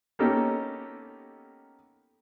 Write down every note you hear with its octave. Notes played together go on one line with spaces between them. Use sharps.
A#3 B3 C#4 D#4 G4 A4